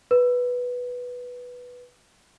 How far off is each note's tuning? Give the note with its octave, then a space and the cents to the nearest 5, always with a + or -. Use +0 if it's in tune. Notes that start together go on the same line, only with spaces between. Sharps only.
B4 -5